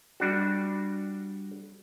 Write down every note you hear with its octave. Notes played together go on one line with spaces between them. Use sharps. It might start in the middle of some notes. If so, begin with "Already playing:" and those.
G3 D4 F#4